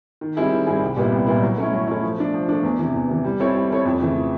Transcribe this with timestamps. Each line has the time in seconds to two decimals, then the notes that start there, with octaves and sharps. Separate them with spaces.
0.21 D#3
0.37 G3 C4 E4 G#4
0.51 D#3
0.67 G3 C4 E4 G#4
0.81 C2
0.97 A#2 G3 B3 E4
1.12 C2
1.27 A#2 G3 B3 E4
1.42 F#3
1.58 A3 C#4 E4
1.73 F#3
1.87 A3 C#4 E4
2.03 F3
2.18 A3 D4
2.34 F3
2.49 A3 D4
2.63 E2
2.79 C3 E3
2.94 E2
3.09 C3 E3
3.24 G3
3.40 C4 E4 A4 C#5
3.55 G3
3.70 C4 E4 A4 C#5
3.85 F2
4.00 C#3 E3 A3